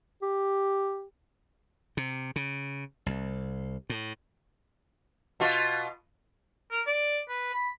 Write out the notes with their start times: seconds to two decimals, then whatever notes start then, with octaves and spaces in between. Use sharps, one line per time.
0.22 G4
1.97 C3
2.36 C#3
3.06 C2
3.90 A2
5.40 B2 F4
6.71 A#4
6.87 D5
7.29 B4
7.53 B5